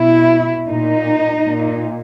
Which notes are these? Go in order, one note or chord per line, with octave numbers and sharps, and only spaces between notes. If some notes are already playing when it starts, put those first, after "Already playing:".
Already playing: B2 E4
A#2 D#4
A#2